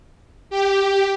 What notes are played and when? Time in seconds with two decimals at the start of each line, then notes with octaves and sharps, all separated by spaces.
0.50 G4